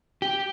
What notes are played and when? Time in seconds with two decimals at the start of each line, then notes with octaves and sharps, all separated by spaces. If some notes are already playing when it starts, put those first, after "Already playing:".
0.22 G4